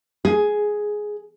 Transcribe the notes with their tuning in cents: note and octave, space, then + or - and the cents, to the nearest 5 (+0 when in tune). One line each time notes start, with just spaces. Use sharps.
G#4 +5